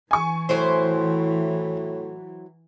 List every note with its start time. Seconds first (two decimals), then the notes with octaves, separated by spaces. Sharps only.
0.11 E3 G#5 C#6
0.49 A2 F#3 E4 C5